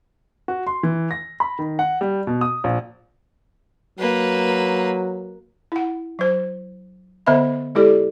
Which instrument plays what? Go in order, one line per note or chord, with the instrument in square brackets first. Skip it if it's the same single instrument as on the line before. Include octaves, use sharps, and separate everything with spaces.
[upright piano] F#4
C6
E3
A#6
B5
D#3
F#5
G3
B2
D#6
A#1
[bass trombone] F#3 [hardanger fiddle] A#3 B4
[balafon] E4 F#5
F#3 C5
D3 B3 C5 D#5 E5 B5
G#3 E4 G4 A4 D5